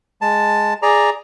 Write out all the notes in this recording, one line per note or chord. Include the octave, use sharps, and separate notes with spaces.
G#3 A5
G#4 D5 A#5